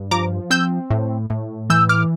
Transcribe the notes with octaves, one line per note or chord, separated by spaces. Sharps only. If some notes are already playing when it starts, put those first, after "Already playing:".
Already playing: G2
F3 A#5 D6
C4 E6 G6
A2
A2
E3 E6 G6
D6 F6